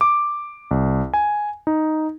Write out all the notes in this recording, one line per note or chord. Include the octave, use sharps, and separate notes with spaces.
D6
C2
G#5
D#4